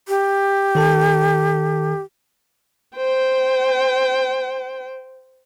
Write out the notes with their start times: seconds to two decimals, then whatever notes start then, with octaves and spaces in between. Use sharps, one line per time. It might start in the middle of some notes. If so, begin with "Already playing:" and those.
0.08 G4
0.75 D#3 A4 A5
2.97 C5 G5